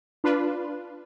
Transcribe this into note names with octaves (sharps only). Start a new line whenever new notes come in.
D4 F4 B4